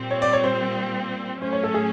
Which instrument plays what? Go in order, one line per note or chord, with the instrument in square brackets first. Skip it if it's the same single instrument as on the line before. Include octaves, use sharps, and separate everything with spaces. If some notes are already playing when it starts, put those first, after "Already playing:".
Already playing: [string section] A#2 G3 C4
[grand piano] C#5
D5
C#5
C5
[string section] A2 F#3 A3 C#4 [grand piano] C5
[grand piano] C#5
A4
G#4